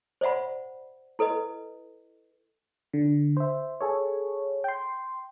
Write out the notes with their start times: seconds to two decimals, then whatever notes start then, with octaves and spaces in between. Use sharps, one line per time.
0.21 C5 D5 E5 F#5 B5
1.19 E4 A4 B4 D#5
2.94 D3
3.37 C5 E5
3.81 G#4 A4 C#5
4.64 G5 C6